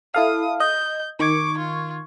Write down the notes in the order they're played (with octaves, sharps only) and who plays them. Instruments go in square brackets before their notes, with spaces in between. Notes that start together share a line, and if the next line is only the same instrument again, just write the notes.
[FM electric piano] E4 A4 F5 [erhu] D#6
[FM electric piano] D#5 [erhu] G6
[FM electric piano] D#3 C#6 G#6 [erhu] D6
[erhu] F4